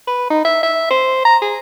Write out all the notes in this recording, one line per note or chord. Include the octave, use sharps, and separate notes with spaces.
B4
D#4
E5
E5
C5
A#5
G#4